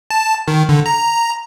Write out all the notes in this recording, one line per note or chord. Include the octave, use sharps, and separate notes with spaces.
A5
D#3
D3
A#5